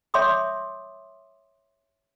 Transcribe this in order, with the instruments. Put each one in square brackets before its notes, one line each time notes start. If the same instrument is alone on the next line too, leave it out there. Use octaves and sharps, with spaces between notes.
[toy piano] C#5 E5 G5 C6 D6 D#6